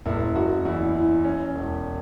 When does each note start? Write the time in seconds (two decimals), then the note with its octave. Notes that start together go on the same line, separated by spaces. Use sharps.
0.06 F#1 E4
0.35 F#1 F#4
0.65 E2 E4
0.95 E3
1.25 C#4
1.55 E1